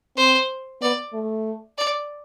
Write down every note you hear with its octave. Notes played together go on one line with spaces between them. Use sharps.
C4 C5
B3 D5
A3
D5